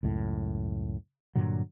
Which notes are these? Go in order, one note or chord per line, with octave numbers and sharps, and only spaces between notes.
C#2 F#2 A2
G2 A#2 D3 F#3